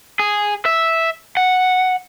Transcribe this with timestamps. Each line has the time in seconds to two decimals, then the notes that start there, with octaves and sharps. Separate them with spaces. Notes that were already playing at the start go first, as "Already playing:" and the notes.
0.19 G#4
0.65 E5
1.37 F#5